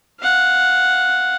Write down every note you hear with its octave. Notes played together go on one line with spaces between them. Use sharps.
F5 F#5